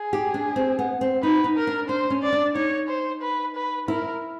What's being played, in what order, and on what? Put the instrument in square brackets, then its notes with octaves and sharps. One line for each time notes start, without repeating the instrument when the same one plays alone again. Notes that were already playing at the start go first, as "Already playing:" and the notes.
Already playing: [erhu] G#4
[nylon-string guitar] G4
D4
C4
B3
C4
[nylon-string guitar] D#4 [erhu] B4
[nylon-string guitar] D#4
[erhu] A#4
[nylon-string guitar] D4
[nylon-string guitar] D4 [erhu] C5
[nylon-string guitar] C#4
[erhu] D5
[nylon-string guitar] D4
[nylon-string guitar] D#4 [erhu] C#5
[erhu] C5
B4
B4
[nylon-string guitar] E4 [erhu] A#4